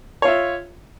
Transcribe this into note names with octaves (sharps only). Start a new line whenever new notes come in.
F4 C#5 E5